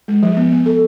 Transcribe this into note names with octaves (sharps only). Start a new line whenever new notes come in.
G#3
F3
B3
B3
A4